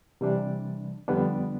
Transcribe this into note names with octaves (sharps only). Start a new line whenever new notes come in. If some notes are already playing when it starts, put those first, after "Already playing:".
C3 E3 G3 D4
F2 D3 G3 B3 D4